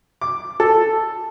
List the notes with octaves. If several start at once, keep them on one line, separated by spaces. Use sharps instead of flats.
D6
A4